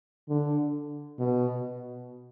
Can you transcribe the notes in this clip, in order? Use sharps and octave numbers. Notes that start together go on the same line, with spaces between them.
D3
B2